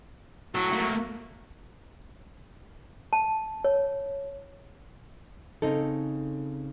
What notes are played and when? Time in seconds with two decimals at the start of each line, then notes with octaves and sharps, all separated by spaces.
0.55 F#3 E4 A4
0.72 A3 A#3
3.13 A5
3.64 C#5
5.62 C#3 C4 D#4 A4